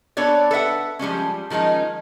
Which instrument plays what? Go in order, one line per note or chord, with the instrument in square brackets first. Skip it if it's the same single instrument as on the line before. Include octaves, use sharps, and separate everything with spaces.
[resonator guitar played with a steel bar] B3 D4 A4 C#5 D5
A4 B4 E5 F#5
F3 G3 G#3 C#4
D#3 F3 G#3 C#4 D#4